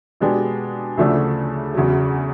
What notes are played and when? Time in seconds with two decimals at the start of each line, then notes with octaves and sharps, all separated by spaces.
0.20 B2 G#3 B3 D4 G4
0.97 D2 C#3 F3 A3 D4
1.74 E2 C#3 F#3